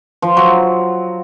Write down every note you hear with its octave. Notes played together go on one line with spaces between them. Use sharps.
F3
F#3